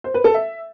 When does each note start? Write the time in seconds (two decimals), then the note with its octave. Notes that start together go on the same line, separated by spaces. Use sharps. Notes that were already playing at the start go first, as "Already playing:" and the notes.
0.04 C5
0.14 B4
0.24 A4
0.34 E5